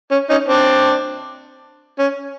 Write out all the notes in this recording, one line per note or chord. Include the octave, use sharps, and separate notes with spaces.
C#4
C#4 D#4
C4 D4
C#4